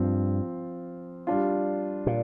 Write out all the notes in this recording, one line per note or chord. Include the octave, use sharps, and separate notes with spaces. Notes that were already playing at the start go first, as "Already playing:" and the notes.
Already playing: G2 F3 C4 F4
G3 D4 F4
A#2